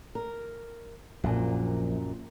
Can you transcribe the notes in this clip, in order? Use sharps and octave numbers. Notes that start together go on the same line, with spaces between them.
A#4
A#1 F#2 A#2